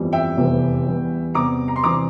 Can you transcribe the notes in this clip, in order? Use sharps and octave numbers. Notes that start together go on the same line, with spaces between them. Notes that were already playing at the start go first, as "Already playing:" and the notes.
Already playing: G1 F2 E3 G3
E5 G5
F1 E2 C3 E3 G3
E2 E3 G3
E2 C3 G3 A#5 D6
A#5
C6
C3 E3 G3 A#5 D6